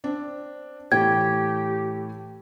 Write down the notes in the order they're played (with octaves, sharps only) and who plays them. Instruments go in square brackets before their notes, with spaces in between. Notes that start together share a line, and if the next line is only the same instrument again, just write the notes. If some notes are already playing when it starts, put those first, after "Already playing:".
[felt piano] C4 D4
[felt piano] A2 E3 A3 [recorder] G4 [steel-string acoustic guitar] G5 [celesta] G#6